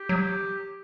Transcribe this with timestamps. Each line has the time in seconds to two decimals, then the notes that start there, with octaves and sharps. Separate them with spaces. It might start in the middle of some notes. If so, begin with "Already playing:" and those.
Already playing: G4
0.09 F#3